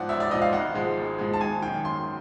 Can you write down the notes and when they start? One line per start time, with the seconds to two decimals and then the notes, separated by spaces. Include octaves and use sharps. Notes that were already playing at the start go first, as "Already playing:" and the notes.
Already playing: G#2 F3 D5 F#5
0.09 A1 E5
0.20 D5
0.31 G#2 F3 D#5
0.42 F5
0.53 G#1 F#5
0.74 G#2 F3 G#3
0.97 G#1
1.18 G#2 F3 G#3
1.33 A5
1.41 G#1 G#5
1.62 F#2 D#3 G5
1.84 G#1 C6